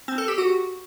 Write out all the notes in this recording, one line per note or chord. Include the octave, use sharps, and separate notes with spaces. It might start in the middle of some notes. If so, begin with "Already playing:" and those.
C4
A4
G4
F#4